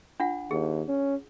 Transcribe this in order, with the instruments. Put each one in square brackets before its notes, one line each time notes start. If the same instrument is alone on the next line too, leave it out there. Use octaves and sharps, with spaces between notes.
[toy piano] D4 F4 F#5
[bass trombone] D#2 [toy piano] G#4
[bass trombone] C#4